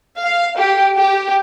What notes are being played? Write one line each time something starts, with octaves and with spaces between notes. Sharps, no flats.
F5
G4
G4